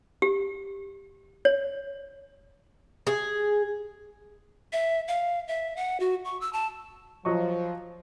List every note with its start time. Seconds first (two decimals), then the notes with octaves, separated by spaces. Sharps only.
0.22 G4
1.45 C#5
3.07 G#4
4.73 E5
5.08 F5
5.48 E5
5.76 F#5
6.00 F#4
6.25 C#6
6.41 E6
6.53 A5
7.25 F3 F#3 D#5 C#6